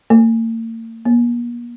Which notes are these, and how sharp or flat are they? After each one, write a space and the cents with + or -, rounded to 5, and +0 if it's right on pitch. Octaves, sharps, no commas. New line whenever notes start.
A#3 -45
A#3 +45